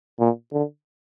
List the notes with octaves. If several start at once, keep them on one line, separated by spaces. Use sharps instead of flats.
A#2
D3